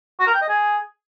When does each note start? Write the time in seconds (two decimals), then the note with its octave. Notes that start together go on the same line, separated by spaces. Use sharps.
0.20 F#4
0.27 A#4
0.34 G5
0.42 D#5
0.49 G#4